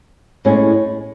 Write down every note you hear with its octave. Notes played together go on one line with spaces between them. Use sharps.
A2 G#3 C#4